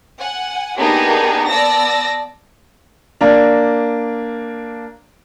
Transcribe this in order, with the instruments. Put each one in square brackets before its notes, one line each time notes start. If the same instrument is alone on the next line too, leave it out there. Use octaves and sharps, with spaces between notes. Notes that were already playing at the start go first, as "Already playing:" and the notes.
[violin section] F#5 G#5
A#3 B3 D4 D#4 G4 G#4
B3 D5 A5 E6 A#6
[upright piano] A#3 D4